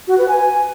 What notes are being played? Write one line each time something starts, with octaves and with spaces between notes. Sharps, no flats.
F#4
B4
G#5